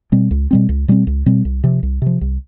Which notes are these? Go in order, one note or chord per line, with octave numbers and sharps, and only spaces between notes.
B2 G3 C4
C#2
B2 G3 C4
C#2
B2 G3 C4
C#2
B2 G3 C4
C2
C3 F3
C2
C3 F3
C2